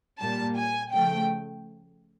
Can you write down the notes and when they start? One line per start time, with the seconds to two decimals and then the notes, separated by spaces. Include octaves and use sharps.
0.20 A#2 G3 A#3 A5
0.57 G#5
0.93 C#3 F3 A3 G5